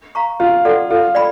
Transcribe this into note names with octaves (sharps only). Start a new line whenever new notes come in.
F5 A#5 C#6
C#4 F4
F#4 A4 D5 F#5
F4 A4
D5 G5 B5